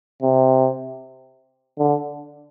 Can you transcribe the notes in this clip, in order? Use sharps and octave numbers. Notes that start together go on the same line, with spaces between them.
C3
D3